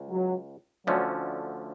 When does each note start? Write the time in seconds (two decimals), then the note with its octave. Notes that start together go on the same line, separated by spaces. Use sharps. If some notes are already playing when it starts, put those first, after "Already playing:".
Already playing: C#2
0.10 F#3
0.87 D2 D3 F3 F#3 A3 C#4